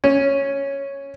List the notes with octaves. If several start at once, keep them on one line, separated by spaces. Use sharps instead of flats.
C#4